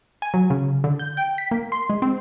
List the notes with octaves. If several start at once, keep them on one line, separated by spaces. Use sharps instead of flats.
G#5
F#3
C#3
D3
G6
G5
B6
A#3
C6
G#3
C4